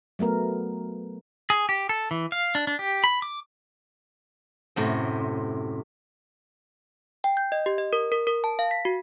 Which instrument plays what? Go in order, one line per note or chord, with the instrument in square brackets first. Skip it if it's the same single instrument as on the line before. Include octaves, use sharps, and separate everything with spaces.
[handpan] F#3 A3 B3 A#4
[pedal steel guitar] G#4
G4
A4
E3
F5
D4
D4
G4
B5
D6
[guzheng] F#2 A2 C3
[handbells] G5
G6
D#5
G4
D#5
A#4
A#4
A#4
A5
F5
B6
F#4